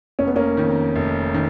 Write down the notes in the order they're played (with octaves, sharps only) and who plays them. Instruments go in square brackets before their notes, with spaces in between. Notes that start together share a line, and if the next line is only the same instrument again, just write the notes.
[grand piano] F1 [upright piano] C#4
[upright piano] B3
A#3 C#4
[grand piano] F2 D#3
F1
D#3